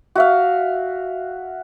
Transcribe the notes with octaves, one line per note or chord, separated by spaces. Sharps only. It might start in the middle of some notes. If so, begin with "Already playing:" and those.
F#4 E5 F5